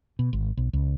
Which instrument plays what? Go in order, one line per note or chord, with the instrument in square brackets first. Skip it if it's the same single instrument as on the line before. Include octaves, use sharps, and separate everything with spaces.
[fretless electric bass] B2
G#1
B1
C#2